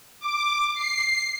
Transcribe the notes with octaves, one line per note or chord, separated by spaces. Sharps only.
D6
C7